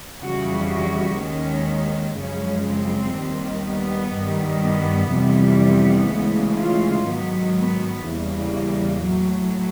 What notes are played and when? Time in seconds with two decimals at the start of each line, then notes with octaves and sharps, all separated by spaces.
0.23 F2 C#3 E3 G3 F#4
0.71 F#4
1.20 D#2 D#3 G#3 C#4
2.18 F#2 C#3 F3 G#3 C#4
2.67 C4
3.16 D#2 D#3 G3
3.65 B3
4.15 G2 D#3 G3
4.63 B3
5.13 F2 C3 E3 G3
5.62 B3
6.10 D2 C#3 E3 G#3
6.59 F4
7.08 G#2 D#3 F#3 B3
7.58 B3
8.06 E2 C#3 E3 G3 A#3
9.04 A2 F#3